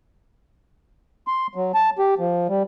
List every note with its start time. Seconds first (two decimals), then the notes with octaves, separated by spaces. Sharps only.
1.27 C6
1.55 F#3
1.74 A5
1.99 G4
2.19 F3
2.48 G3